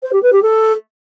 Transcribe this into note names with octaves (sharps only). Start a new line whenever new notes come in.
C5
G4
B4
G4
A4